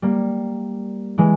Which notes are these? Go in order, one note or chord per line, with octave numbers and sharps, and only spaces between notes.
G3 A#3
E3 G#3